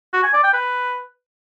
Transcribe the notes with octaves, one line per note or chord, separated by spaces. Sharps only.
F#4
G#5
D5
G5
B4